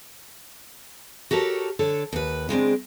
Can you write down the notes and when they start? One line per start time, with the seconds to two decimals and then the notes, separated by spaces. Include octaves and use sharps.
1.31 F#4 G4 A4 A#4 C#5
1.79 D3 A4 C#5
2.13 D#2 B4
2.49 C#3 G#3 C4 D4